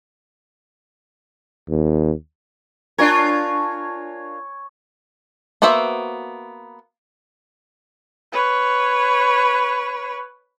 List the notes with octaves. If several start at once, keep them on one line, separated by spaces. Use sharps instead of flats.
D#2
D4 F4 A#4 C#5 G#5 C#6
A#3 B3 F#4 C5 E5
B4 C#5